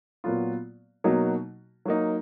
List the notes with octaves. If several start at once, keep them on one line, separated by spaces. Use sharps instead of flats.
A#2 F#3 B3 F4
B2 F#3 A#3 D#4 F#4
F#3 A#3 D#4